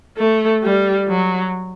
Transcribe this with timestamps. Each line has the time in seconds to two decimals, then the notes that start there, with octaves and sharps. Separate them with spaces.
0.17 A3
0.63 G3
1.08 F#3